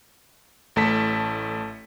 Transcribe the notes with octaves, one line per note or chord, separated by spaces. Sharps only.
A1 A3 A5 B6